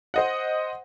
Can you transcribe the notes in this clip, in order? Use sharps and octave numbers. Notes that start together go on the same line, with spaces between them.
C5 D#5 F#5